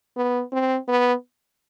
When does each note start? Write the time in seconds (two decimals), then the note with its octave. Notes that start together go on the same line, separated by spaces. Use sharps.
0.16 B3
0.52 C4
0.88 B3